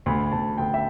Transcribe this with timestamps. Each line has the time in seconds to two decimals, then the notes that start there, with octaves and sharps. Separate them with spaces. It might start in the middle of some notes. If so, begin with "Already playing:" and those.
0.06 D2 B5
0.32 D2 A5
0.58 D2 G5
0.74 E5